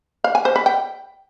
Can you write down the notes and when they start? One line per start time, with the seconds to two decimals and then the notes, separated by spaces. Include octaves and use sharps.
0.24 F5
0.35 G#5
0.45 C5
0.56 B4
0.66 G5